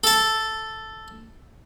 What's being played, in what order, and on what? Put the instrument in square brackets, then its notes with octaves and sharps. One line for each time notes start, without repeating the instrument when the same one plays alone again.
[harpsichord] A4 A5